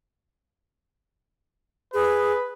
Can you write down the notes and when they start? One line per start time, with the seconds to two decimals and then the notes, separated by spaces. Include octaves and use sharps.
1.94 G#4 B4